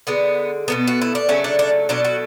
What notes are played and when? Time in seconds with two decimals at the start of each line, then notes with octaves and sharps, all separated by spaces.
0.07 D3 G#3 B3
0.68 B2 F#3 A3 B3
0.87 F#4
1.01 E4
1.15 D4
1.29 C#3 F#3 A3 C#4
1.44 D4
1.59 D4
1.89 B2 F#3 A3 D4
2.05 F#4